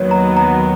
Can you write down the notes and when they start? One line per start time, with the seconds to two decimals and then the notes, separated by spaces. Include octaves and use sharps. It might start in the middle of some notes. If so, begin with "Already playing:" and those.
Already playing: D#2 D#3 F#3 B3 C#5
0.11 A#5
0.37 A#5